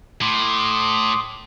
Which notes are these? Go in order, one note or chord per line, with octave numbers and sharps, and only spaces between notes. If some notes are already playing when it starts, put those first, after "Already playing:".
A2 C6 D6 D#6